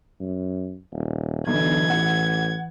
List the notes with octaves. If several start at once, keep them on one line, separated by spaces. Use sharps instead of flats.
F#2
D#1
B1 D3 E3 G#6
A1 F#5